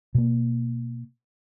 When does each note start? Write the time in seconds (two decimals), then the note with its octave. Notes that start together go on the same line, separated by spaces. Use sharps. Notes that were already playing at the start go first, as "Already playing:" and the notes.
0.15 B2 A#3